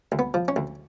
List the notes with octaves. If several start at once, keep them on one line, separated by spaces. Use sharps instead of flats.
D2
B3
F3
C#4
D2